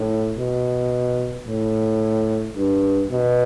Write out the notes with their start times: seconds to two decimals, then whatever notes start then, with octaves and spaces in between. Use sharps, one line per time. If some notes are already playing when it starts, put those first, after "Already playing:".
Already playing: A2
0.38 B2
1.47 A2
2.56 G2
3.10 B2